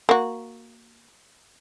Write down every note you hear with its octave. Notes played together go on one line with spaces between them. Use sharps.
A#3 F#4